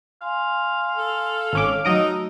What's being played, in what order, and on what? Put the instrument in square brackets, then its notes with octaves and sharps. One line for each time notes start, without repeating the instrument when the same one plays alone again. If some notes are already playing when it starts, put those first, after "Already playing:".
[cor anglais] F5 [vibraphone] G#5 C6
[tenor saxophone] A4
[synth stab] G#1 C#4 D6
[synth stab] F#3 D#5 D7 [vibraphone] A3 F#4 E6 [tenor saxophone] D#4